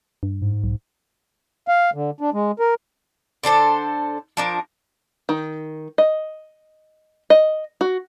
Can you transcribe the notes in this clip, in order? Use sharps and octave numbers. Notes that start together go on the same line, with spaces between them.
G2
G#2
B1
F5
D3
D4
G#3
A#4
D3 D4 A4 C5
F3 D4 A#4
D#3
D#5
D#5
F#4